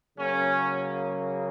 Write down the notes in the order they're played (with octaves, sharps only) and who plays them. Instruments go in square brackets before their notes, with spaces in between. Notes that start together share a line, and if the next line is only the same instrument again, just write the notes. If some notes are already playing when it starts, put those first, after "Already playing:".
[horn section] C#3 F#3 A#3 C#4